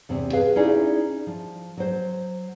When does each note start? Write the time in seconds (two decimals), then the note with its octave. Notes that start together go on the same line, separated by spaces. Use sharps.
0.09 E2 C3 C4
0.33 G#4 B4 F5
0.56 C#4 D#4 E4 G#4 D5 E5
1.27 F3
1.77 F#3 C5